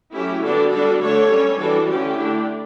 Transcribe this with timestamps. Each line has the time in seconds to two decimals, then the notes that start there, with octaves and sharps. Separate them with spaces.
0.13 F#3 A3 C#4 E4 G4
0.42 D3 G3 B3 D4 F#4 A4
0.72 G3 D4 F#4 A4
1.01 D3 A3 D4 A4 C#5
1.31 G3 C#4
1.60 E3 G3 D4 F#4 A4
1.89 D3 A3 C#4 E4 G4
2.19 D3 A3 D4